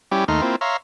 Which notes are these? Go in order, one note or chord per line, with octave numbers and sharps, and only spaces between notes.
G3 C#4 E4 G4
D#2 A3 D#4 C6 F6
A#3 C4 E4 F4
C#5 E5 F5 A#5 C6